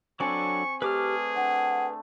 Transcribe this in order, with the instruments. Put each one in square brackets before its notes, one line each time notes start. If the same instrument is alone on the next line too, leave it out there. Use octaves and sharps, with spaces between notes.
[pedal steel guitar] F#3 D4 A4 [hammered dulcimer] C4 G#5 [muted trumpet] C#6
[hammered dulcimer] A3 D5 [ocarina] G4 [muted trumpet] G#4 [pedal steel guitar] B4 D6 F6
[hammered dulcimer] D4 [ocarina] F#5